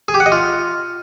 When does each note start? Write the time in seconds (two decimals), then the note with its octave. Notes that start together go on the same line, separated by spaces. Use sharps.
0.08 G#4
0.14 G4
0.20 F#5
0.26 D#5
0.32 F4